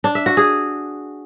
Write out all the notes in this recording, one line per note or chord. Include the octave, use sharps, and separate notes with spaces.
D4
E5
F#4
G#4